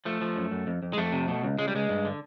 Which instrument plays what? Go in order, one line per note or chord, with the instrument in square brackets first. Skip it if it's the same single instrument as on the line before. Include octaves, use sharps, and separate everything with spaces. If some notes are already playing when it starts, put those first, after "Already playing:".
[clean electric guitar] F3 A3
F3
F#2
F#2
F2
F2
G#3
F2 A3
C3
B2
C#2
C#2 G#3
G3
C#2 G#3
G2
D3